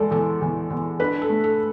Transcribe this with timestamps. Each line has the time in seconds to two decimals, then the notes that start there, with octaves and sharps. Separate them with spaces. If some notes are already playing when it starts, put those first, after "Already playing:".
Already playing: E2 G#3 A4 D5
0.11 E2 A4
0.41 E2
0.70 E2
1.00 D4 B4
1.22 A4
1.29 A3
1.44 A4